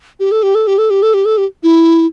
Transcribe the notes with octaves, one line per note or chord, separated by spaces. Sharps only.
G4
A4
G4
A4
G4
A4
G4
A4
G4
A4
G4
E4